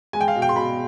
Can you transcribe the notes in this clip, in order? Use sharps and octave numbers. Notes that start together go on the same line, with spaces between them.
G#3 G#5
G5
F5
B2
G5
C6
B2 B5